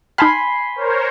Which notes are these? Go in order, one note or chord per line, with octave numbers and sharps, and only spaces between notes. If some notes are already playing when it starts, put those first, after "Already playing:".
D#4 G#5 A5 B5 C6 F6
A#4 C5 C#5